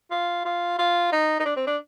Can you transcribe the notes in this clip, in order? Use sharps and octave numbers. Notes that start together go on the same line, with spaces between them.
F4
F4
F4
D#4
D#4
D4
C4
D4